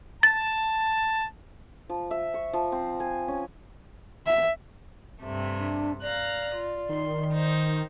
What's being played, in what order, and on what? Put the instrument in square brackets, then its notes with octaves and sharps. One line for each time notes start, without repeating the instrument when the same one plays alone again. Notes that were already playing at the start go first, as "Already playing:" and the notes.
[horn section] A5 [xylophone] A6
[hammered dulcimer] F3
E5
C#6
F3
C4
G#5
C#4
[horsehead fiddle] E5
[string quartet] G2 C3 A3
[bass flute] D4
[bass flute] D5 [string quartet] F5 A#5 F#6
[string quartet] F4
[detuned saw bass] D#3 [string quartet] C6
[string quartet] D#4 C5